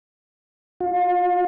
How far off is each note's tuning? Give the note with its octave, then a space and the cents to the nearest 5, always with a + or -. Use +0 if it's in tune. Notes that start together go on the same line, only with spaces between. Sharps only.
F4 +35